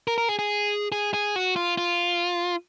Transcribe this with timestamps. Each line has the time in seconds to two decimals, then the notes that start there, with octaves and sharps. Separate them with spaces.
0.07 A#4
0.18 A#4
0.29 G#4
0.39 G#4
0.92 G#4
1.14 G#4
1.36 F#4
1.56 F4
1.78 F4